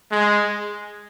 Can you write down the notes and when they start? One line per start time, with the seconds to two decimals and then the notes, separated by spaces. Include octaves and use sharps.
0.11 G#3